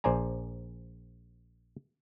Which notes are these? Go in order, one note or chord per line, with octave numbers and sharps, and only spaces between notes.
A#1 C5 D5 G#5 A#5